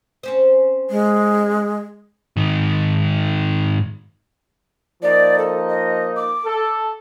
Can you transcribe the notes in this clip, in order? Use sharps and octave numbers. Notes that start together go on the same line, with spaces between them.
C4 C#4 C5
G#3
G#2 D#3
F3 A#3 D#4 D5
A4
D#5
D6
A4